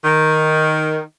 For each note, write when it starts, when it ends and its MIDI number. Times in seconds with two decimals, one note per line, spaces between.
0.04 1.02 51